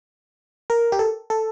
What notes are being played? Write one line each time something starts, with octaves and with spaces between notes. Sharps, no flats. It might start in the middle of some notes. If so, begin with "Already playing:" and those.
A#4
G4
A4
A4